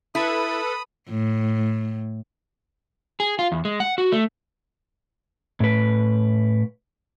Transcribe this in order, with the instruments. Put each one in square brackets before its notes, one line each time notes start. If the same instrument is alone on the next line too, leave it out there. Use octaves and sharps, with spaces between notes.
[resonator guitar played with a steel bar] E4 [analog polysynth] A4 B4 [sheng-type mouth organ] B5 D#6
[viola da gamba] A2
[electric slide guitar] G#4
F4
E2
G#3
F#5
F#4
A3
A2 B4